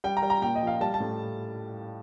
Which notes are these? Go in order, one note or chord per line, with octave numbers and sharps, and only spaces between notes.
G3 G5
A#5
G3
A#5
A#2 G5
D#5
F3
F5
G3 A5
A5
A2